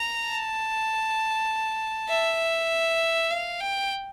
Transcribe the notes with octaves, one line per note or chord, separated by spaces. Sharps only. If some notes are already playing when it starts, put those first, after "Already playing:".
Already playing: A#5
A5
E5
F5
G5